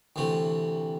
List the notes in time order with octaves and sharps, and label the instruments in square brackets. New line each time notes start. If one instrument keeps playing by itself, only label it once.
[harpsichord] D2 C3 E3 A3